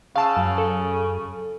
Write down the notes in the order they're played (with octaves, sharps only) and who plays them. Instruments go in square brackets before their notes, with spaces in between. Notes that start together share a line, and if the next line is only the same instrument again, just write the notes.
[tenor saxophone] C#3 [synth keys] F5 A5 E6
[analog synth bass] F#2
[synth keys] A4